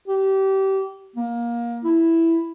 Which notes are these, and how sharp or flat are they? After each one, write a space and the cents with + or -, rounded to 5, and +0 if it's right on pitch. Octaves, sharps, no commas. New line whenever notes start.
G4 -25
A#3 +20
E4 +0